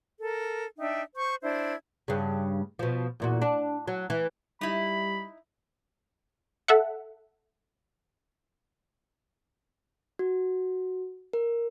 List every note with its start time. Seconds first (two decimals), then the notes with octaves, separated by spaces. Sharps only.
0.20 A4 A#4
0.79 D4 D#4 E5 G5
1.16 C5 C#6 G6
1.43 D4 E4 C5 G#6
2.08 G2 C#3
2.79 B2 F3
3.20 E2 A#2 F#4
3.42 D4
3.88 F#3
4.10 E3
4.61 G3 D#4 E4 B5
6.68 A4 E5 F#5
10.19 F#4
11.33 A#4